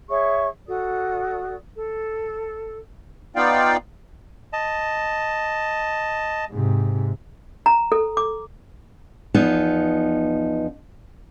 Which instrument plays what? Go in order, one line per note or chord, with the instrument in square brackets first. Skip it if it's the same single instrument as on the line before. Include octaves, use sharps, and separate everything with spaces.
[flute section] G#4 C#5 E5 C#6
F#4 A4 D5 D#6
A4
[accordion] B3 D#4 F4 D5 F5 G5
[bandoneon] D#5 A5
[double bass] G#2 C3
[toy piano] A#5
A4
D6
[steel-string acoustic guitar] E2 F3 B3 D#4